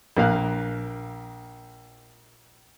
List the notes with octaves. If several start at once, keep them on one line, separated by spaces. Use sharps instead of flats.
A#1 A#3 F5 F#6